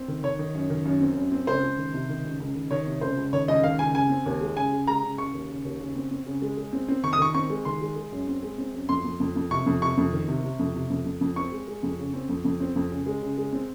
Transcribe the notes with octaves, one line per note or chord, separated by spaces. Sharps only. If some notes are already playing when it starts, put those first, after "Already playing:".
Already playing: C4
D#3
D#3 C#5
D#3
F#2
D#3
F#2
C4
F#2
C4
C#2 C5
C#2
D#3
C3
D#3
C#2
C#2
D#3
D#3 C#5
C3
C#2 C5
C#2
D#3 C#5
C#2 D#5
D#3 F5
C#2 G#5
C#3 G#5
C4
D#2
G#3
C#3 G#5
C#3
G#3 A#5
C#3
C#3 C#6
D#2
C#3
D#2
C#3
C4
C4
C#3
G#3
G#3
C4
C4
D#3 C#6
D#6
D#3 C#6
C4 C#6
G#3
D#3 C6
G#3
G#3
F#2
C4
G#3
C4
F#2
F2 C6
F2
F2
F2
C3 C#6
F2
C3 C#6
F2
D#3
C3
C3
F2
C3
F2
F2
F2
C4 C#6
G#3
G#3
F2
C#3
C4
F2
F2
C4
F2
C#3
G#3
C#3
G#3
C4